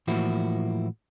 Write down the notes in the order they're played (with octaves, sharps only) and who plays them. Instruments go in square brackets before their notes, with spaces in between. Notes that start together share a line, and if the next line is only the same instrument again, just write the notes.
[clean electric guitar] A2 E3 F3 A#3 E4 F#4